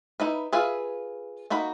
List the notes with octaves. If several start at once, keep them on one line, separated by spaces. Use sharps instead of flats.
D#4 E4 B4
F4 G#4 B4 E5 F5
A#3 D#4 F#4 B5